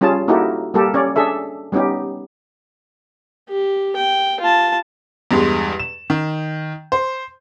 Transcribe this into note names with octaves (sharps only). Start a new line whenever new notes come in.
G3 C#4 F4 G#4 A5
A#3 D#4 E4 F#4 G4 A4
G3 A#3 G4 A4
C#4 C#5 D5
D4 G#4 A4 E5
G3 B3 C#4 D#4 G4
G4
G5
F4 A5
E2 G2 G#3
E7
D#3
C5